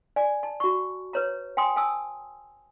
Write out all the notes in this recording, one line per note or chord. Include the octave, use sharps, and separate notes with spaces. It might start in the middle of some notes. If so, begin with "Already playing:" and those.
D5 G#5
A5
F#4 C#6
B4 C#5 A#5
G5 G#5 C6 D#6
G#5 A5 D#6 E6